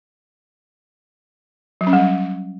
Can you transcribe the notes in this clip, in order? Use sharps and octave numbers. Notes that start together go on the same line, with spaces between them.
F#3
C#4
G3
F#3